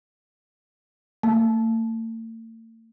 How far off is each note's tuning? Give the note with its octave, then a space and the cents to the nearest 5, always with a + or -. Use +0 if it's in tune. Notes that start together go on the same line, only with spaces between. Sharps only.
A3 +45